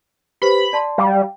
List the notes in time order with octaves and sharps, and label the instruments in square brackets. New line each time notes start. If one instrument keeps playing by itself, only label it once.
[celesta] G4 B4 C5 [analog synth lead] B5
[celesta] D5 A5 C6
[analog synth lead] G3 [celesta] F5 G5